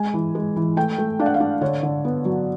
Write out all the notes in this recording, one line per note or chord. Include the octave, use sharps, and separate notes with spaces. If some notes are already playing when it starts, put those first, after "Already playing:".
Already playing: G#3 G#5
E3
G#3
E3
A3 G5
A3
D4 F5
F#5
F5
D4
D3 C#5
D3
B3
F#3